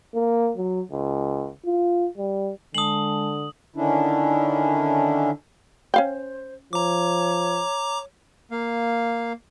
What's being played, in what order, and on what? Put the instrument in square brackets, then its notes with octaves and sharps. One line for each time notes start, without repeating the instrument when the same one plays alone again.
[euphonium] A#3
F#3
C#2
F4
G3
[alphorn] D3 [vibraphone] G#3 A5 [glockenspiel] D#6 F#7
[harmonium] D3 D#3 C#4 D4 E4
[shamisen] C#4 F5 G5 [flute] C5
[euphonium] F3 [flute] C#5 [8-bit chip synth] A#5 D6
[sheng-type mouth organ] A#3 F5